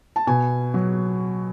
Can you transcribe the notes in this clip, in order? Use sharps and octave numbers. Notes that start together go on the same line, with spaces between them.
A5
B2 G#5
F#3